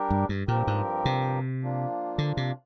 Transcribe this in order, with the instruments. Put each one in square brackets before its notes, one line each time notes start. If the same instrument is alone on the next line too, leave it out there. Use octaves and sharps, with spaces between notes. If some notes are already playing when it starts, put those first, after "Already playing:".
Already playing: [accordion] G3 D4 G4 A#4
[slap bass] G2
G2
[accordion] G2 F3 C4 G4 A#4 [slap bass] A#2
[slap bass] G#2
C3
[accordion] F3 A#3 D4 F4
[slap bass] D3
C3